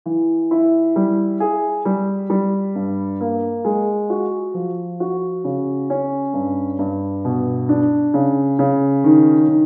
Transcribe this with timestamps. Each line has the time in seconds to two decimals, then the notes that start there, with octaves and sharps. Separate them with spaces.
0.06 E3
0.51 E4
0.96 G3
1.40 G#4
1.85 G3
2.30 G3
2.75 G2
3.21 A#3
3.65 G#3
4.10 F#4
4.54 F3
5.00 F#4
5.44 C#3
5.90 C#4
6.34 G2
6.79 G2
7.25 B2
7.69 D4
8.14 C#3
8.59 C#3
9.04 D#3
9.48 D#3